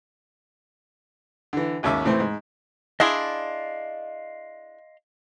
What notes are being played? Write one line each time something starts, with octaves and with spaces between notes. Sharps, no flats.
D3 E3
G#1 D#2 C#4 E5 D6
A2 E3 A3 C4
G#2
D4 E4 G#4 D#5 F5 C6